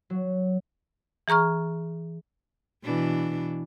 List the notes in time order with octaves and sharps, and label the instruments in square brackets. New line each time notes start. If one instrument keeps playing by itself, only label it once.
[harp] F#3
[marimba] E3 G#4 A#5 C#6 F6
[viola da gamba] B2 E3 D4